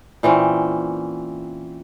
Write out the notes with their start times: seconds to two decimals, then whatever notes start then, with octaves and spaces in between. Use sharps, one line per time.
0.23 A#2 E3 C4 C#4